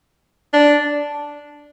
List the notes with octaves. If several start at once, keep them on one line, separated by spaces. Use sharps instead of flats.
D4